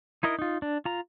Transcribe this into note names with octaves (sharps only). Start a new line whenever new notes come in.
D#4 E4 A#4 D#5
D#4 F4
D4
F4 A#5